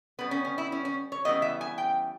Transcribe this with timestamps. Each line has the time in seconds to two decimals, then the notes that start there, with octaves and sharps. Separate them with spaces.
0.19 C#3 G3 B3 B4
0.31 C#4
0.45 C#4
0.58 E4
0.72 C#4
0.85 C#4
1.12 C#5
1.25 C#3 E3 G3 B3 D#5
1.42 E5
1.61 G#5
1.78 G5